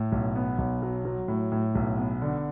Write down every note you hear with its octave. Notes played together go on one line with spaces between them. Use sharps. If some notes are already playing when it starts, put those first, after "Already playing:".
Already playing: A2
B1
B3
B1
F#3
F#3
A2
A2
B1
B3
D3